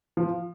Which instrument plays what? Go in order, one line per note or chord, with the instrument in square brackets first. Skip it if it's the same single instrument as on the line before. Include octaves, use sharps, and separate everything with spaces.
[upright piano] F3